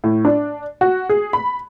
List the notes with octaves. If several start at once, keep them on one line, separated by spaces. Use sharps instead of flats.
A2
D4
F#4
G#4
B5